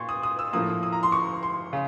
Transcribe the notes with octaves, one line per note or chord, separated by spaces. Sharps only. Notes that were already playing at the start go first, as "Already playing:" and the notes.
Already playing: A#2 C6 C#6
D#6
D#6
E6
A2 F3 A#3 D#6
D#6
A#5
C6
C#6
C6
C#3